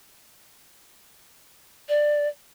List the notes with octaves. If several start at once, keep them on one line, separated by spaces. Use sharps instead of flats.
D5